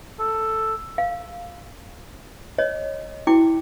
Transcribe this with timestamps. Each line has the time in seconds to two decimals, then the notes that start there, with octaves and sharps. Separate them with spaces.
0.19 A4
0.98 F5
2.58 C#5 D#5
3.27 E4 F#4 G5 D6